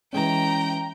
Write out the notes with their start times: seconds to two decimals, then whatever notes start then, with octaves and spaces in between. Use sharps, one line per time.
0.13 E3 G#3 C#4 G5 A#5